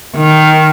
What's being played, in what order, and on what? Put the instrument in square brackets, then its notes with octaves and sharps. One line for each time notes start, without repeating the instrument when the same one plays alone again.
[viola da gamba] D#3